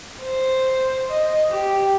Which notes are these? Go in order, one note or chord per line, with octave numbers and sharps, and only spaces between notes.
C5
D#5
G4